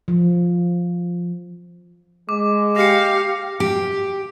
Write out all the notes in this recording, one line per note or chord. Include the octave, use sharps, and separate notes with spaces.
F3
G#3 D6
G4 F5 A#6 C#7
G4